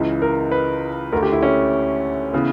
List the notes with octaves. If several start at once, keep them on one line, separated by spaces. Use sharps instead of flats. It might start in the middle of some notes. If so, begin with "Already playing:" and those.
Already playing: C#2 C#3 E3
A#4
B4
D2 D3 A#4
G4
E4
C#4
C#3 E3 B3